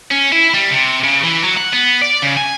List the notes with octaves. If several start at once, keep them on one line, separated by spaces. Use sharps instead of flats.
C#4
E4
G3
C3
C#3
E3
F#3
F#5
B3
D5
C#3
G#5